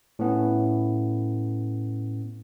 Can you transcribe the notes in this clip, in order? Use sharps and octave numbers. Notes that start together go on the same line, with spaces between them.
A2 B3 C#4